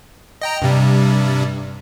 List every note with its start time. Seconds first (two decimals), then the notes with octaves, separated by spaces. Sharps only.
0.42 D#5 G5 A#5
0.62 G2 C3 G3